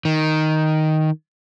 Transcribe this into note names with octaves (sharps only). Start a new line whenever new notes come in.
D#3